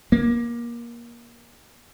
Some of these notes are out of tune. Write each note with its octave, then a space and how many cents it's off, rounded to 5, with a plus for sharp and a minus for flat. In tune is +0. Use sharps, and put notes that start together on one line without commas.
A#3 +25